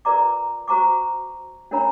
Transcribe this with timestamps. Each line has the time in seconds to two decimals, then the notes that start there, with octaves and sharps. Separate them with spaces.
0.05 F4 A#4 B4 D5 A#5 D6
0.68 F#4 C5 A#5 C#6 D6
1.71 C#4 D4 A#4 C#5 A#5 B5